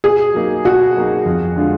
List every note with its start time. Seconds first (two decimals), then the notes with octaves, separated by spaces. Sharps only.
0.04 B2 G#4
0.34 F#3 A#3 D#4
0.65 B2 F#4
0.96 F#3 A#3 D#4
1.26 F2
1.56 D3 G#3 D4 F4